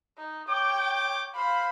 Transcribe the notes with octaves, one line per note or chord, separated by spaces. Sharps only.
D#4
C#5 G5 D6
C5 F5 B5